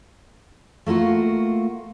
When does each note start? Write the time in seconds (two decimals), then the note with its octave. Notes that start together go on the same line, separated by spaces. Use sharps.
0.86 A3 A#3 F4 F#4